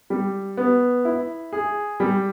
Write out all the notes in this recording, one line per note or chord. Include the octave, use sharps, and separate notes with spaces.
G3
B3
E4
G#4
G3